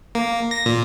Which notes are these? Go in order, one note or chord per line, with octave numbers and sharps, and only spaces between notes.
A#3
A#6
A#2